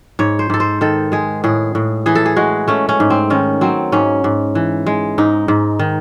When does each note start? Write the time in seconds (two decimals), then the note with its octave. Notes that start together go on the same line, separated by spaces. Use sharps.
0.19 G#2 C#5
0.39 C5
0.50 G#2 A4
0.60 C5
0.81 D#3 A4
1.12 G#3 G#4
1.44 A2 G#4
1.75 A2
2.06 E3 G#4
2.15 A4
2.26 G#4
2.36 G#3 F#4
2.68 A3 C#4
2.89 C#4
3.00 G#2
3.10 C4
3.30 D#3 C#4
3.61 F#3 C4
3.92 G#2 C#4
4.24 G#2
4.55 E3
4.86 G#3
5.18 G#2 D#4
5.48 G#2
5.79 D#3